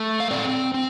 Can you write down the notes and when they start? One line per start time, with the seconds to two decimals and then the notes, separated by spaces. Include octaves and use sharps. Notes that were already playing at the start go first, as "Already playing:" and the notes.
Already playing: A3
0.20 F5
0.31 C4 A4 D5
0.74 C4